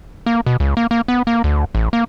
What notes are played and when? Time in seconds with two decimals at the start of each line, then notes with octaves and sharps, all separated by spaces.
0.26 A#3
0.46 B2
0.60 C#2
0.77 A#3
0.91 A#3
1.08 B3
1.27 A#3
1.44 D2
1.75 A1
1.93 A#3